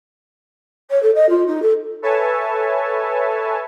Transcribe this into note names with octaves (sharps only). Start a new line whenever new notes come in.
C#5
A4
D#5
F4
D#4
A4
A4 B4 C#5 E5 G#5 A5